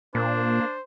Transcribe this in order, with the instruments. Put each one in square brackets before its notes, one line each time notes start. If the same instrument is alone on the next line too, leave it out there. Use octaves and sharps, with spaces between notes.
[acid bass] A#2 [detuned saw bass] A#3 [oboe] D4 [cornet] C5